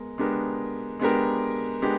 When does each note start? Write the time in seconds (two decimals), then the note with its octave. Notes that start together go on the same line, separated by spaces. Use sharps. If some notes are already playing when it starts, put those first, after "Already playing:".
Already playing: G#3 B3 A#4
0.18 G#3 B3 D4 G4 A#4
1.00 G#3 B3 D4 G4 A#4
1.82 G#3 B3 D4 G4